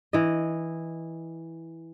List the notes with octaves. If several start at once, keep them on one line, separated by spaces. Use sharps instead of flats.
E3 D#5